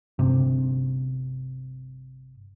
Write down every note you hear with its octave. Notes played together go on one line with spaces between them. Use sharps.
G1 C3